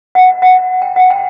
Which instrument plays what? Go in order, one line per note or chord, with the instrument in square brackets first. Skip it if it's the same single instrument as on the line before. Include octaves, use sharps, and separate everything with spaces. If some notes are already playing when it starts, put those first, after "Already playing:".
[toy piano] F#5
F#5
G5
F#5
G5